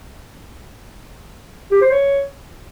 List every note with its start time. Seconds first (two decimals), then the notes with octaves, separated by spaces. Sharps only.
1.71 G4
1.81 C5
1.91 C#5